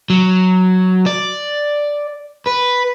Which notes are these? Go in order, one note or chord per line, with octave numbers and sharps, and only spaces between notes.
F#3
D5
B4